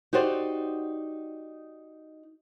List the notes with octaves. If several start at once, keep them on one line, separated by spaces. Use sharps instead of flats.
D#4 F#4 G4 C5 D5